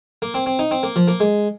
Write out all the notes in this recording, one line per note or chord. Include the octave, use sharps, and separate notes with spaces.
A#3
C4
C4
D#4
C4
A#3
F3
A#3
G#3